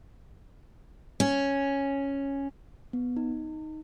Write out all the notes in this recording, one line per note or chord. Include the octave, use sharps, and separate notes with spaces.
C#4
B3
D#4